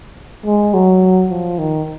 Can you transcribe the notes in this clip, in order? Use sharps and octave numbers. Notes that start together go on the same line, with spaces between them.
G#3
F#3
F3
D#3